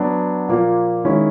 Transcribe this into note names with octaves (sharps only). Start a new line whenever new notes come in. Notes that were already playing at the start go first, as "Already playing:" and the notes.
Already playing: F#3 B3 D4
A#2 F3 A#3
D#3 G#3 C#4 E4